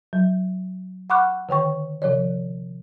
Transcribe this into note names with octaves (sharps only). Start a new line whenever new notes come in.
F#3
F#5 B5 C#6 D6 F6 F#6
D3 D#3 G5 C#6
C3 F3 C#5 D5